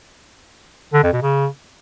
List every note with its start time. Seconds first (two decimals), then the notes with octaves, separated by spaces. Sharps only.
0.94 D3
1.03 F2
1.13 B2
1.23 C#3